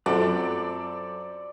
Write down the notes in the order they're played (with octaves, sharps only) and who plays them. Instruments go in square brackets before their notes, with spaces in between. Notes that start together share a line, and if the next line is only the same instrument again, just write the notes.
[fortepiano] F#2 [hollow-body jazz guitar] C4 F4 F#5 [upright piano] A4 C5 [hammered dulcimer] D5